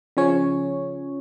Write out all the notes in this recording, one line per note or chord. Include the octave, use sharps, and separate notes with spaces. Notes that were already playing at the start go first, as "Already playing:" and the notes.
C#3 F3 C#4 C#5